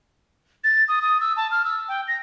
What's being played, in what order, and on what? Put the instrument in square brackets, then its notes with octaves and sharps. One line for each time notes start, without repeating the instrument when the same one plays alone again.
[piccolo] A6
D#6
D#6
E6
A5
F6
E6
G5
A#6